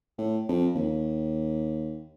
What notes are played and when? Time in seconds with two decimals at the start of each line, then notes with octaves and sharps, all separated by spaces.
0.18 A2
0.49 F2
0.75 D#2